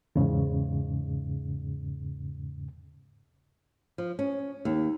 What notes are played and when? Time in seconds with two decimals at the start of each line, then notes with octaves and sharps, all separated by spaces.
0.16 E2 G#2 C#3
3.98 F3
4.19 C#4
4.65 D#2